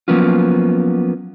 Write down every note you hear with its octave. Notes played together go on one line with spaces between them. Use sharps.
F3 F#3 A#3 B3 C#4 F4